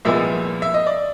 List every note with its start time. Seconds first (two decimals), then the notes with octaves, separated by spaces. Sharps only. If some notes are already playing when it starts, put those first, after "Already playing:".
0.05 C2 A#2 F3 G#3 B3 E5
0.62 E5
0.74 D#5
0.87 D5